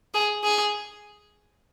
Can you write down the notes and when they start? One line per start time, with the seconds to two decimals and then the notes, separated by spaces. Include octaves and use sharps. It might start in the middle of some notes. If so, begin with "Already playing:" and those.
0.14 G#4
0.44 G#4